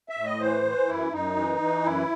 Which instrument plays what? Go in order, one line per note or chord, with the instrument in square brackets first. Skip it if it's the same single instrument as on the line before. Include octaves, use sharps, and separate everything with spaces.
[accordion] E5
A2
D#5
E3 C5
E3
F#2 E4
F#2 D#4
E3
E3
F#2 E4